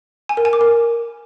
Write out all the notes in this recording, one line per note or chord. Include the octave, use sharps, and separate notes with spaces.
G#5
A#4
G#5
D6
A#4